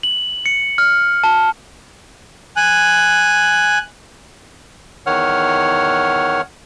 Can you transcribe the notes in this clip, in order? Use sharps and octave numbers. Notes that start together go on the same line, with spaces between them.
F#7
C#7
F6
A5
G#5 F#6
E2 D#3 C#5 F#5 F6